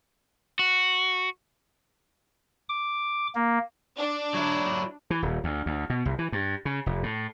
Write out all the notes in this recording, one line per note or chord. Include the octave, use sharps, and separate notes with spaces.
F#4
D6
A#3
D4
F#3 E4
E3
D#1
D2
D2
B2
C2
E3
G2
C#3
F1
A2